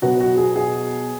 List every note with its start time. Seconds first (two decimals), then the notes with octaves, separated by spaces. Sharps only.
0.02 B2 F#3 B3 F#4
0.20 F#4
0.37 G#4
0.56 G#4